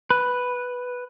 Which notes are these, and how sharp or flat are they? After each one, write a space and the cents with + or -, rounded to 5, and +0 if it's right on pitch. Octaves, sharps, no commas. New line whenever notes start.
B4 +0